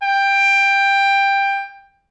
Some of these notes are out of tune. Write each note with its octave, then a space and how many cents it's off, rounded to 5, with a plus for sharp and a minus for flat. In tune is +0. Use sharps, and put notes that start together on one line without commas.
G5 +15